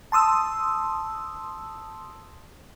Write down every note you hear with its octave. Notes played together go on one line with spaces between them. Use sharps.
A5 C6 D#6 E6